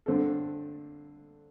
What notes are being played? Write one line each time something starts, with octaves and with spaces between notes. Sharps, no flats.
G2 D3 C4 A4